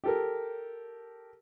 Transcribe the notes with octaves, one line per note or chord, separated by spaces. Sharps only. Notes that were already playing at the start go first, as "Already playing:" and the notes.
G4 A4 A#4